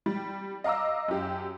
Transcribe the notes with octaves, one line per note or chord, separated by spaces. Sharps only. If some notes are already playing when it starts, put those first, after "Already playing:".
G3
D#5 F5 A#5 D6 E6
F#2 G4